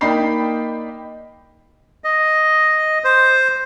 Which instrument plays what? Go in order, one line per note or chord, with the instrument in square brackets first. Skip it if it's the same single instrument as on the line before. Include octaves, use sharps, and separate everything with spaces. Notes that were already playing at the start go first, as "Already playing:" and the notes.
[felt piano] A#3 D#4 D5 G5 B5 C7
[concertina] D#5
C5